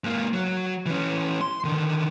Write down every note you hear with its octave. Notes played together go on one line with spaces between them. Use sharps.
G#2 A#3
F#3
E3 C#4
C6
D3 D#3